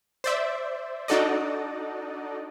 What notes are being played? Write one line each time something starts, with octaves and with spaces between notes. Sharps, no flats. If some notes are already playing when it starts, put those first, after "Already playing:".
C5 D5 E5
D4 D#4 F#4 A4 D5 D#5